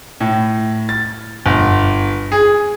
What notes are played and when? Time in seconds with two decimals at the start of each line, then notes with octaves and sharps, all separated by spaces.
0.20 A2
0.89 A6
1.46 G1
2.32 G#4